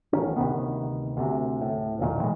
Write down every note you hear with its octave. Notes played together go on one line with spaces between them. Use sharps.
A1 D#3 C#4
D2 C3 D#3 B3
D2 C3
A2
E1 B1 A#2 D#3
A2 D#3 E3 G#3